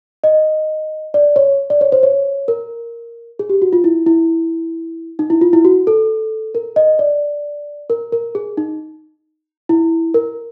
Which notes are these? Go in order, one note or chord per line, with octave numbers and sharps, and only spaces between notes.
D#5
D5
C#5
D5
C#5
C5
C#5
A#4
G#4
G4
F#4
F4
E4
E4
D#4
E4
F4
E4
F#4
A4
A#4
D#5
D5
A#4
A#4
G#4
D#4
E4
A#4